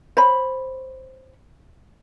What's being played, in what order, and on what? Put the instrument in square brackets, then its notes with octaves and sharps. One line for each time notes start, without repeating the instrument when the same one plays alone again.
[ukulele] C5 C#5 B5